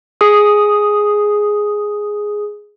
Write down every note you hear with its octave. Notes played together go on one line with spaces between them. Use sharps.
G#4 D#6